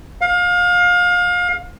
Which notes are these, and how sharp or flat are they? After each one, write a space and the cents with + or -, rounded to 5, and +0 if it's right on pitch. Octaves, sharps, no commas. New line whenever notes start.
F5 +30